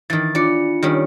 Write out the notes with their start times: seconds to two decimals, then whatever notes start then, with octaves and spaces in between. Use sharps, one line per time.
0.10 D#3 E3 A6
0.35 D4 F4 D5 C#7
0.83 D#3 G3 C#4